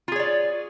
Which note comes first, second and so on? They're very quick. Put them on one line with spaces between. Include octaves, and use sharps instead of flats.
F4 G#4 C#5 D5